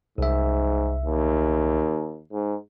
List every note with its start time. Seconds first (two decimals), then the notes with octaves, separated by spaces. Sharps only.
0.18 C2 G#2 E5
1.05 D#2
2.32 G#2